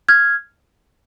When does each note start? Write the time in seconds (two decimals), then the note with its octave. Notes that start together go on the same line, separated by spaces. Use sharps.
0.09 F6 G#6